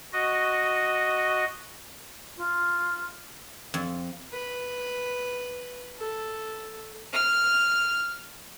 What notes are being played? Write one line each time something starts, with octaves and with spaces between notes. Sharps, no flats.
F#4 D#5
F4
F2
B4
A4
F6